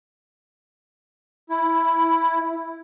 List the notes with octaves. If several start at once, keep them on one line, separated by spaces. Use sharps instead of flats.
E4